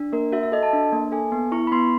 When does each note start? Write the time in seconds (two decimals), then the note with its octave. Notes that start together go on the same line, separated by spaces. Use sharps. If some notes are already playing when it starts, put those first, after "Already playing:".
Already playing: D4
0.12 A#3 A#4
0.32 F#4 E5
0.43 E5
0.52 A4 D#5
0.63 A5
0.73 D4
0.93 A#3
1.12 A4 G#5
1.32 B3
1.52 E4 C#6
1.67 B5
1.72 B3 C6